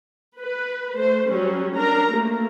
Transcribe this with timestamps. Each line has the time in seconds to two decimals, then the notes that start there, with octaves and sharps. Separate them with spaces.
0.39 B4
0.95 A3 C5
1.29 F#3 G3 C#4
1.74 D4 A#4 A#5
2.11 A3 A#3